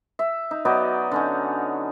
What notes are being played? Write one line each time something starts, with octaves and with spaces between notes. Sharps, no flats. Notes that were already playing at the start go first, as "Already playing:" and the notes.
E5
D#4
F#3 B3 D#4 D5
D3 C#4 D#4